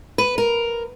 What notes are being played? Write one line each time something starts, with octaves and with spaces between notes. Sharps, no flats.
B4
A#4